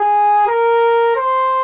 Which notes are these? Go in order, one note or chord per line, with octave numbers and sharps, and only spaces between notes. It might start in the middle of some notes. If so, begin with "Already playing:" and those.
Already playing: G#4
A#4
C5